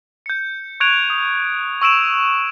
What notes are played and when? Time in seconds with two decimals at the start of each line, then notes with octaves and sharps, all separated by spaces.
0.26 G6 C#7
0.80 C#6 F#6 G#6 D7 F7
1.10 D#6
1.82 C#6 E6 D7 E7 F7